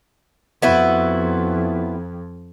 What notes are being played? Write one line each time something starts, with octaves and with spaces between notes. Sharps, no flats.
F2 B3 E4 F#4